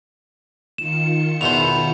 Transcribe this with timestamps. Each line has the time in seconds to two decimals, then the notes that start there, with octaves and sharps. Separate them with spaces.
0.78 D#3 F4 C#7 E7
1.41 E2 B2 C5 F7